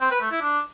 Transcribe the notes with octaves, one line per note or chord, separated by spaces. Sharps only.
C4
B4
A3
E4
D4